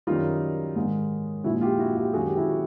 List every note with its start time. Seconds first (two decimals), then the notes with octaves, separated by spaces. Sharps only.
0.07 F#2 D#3 G3 D#4 F4
0.76 G#2 D#3 G#3
1.44 A#2 F3 G#3 E4 F#4
1.61 F4 G4
1.79 E4 F#4
1.96 F4 G4
2.13 F#2 D#3 G#3 F#4 G#4
2.26 G4
2.37 E4 F#4
2.49 F#4